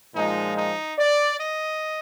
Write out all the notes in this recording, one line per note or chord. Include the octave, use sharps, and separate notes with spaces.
A#2 F3 G#3 D#4
D#4
D5
D#5